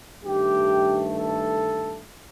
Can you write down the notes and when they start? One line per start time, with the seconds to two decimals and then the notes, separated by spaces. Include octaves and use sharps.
0.25 G2 D#3 A3 G4
1.16 A4